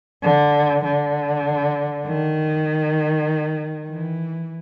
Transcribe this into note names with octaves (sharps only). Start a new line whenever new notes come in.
D3
D3
D#3
E3